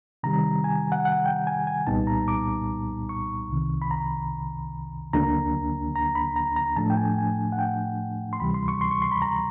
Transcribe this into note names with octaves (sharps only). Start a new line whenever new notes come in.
C3 D#3 G3 A#5
G#5
F#5
F#5
G5
G#5
G#5
C2 A#2 G3 B3 D#4 A5
A#5
D6
C#6
C2 C3 D#3
B5
A#5
D2 D3 F#3 A#3 D4 A#5
A#5
B5
A#5
A#5
A2 F3 A3 D4 A5
G5
G#5
G#5
F#5
G5
C6
D2 C3 E3 G3 B5
C6
C#6
C6
C#6
C6
B5
A#5